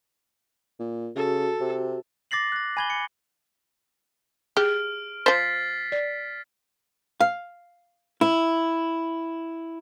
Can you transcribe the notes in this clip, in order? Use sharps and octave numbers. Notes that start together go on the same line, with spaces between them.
A#2
C#3 F#4 A4
C3
D6 A6 A#6 C7 F#7
F#6 A6
G#5 B5 G#6 F#7 G7
C#7
G4 G#4 F6 D7
F3 C5 A6 B6 C7
D5
F5
E4